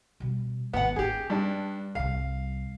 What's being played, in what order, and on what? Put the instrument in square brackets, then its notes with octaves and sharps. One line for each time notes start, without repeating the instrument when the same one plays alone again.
[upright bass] B2 G3
[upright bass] G#1 G#2 [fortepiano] B3 F#5
[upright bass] C#4 [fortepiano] G4 G#4
[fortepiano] G2 D4
[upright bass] C2 G3 [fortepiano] F5